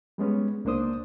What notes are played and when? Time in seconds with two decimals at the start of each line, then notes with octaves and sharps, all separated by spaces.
0.18 G3 G#3 B3 C#4
0.65 C#2 A#3 D4 C5 D#6